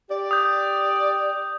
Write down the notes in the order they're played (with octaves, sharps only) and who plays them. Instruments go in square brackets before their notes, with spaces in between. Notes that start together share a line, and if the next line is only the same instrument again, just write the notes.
[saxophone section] G4 D5
[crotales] D#6 G6